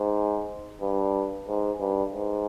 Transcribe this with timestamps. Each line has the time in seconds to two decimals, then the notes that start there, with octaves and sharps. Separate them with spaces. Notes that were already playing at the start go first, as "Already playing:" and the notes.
Already playing: G#2
0.81 G2
1.48 G#2
1.80 G2
2.13 G#2